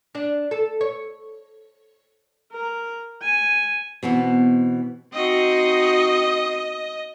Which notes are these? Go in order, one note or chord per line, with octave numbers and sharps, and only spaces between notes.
D4
A4
C#5
A#4
G#5
B2 E3 B3 C4
C4 D#4 F#4 D#5